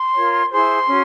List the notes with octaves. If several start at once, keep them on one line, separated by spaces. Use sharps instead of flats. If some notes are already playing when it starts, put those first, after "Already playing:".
Already playing: C6
F4 A#4 C#5
E4 G#4 C5 C6
C#4 F#4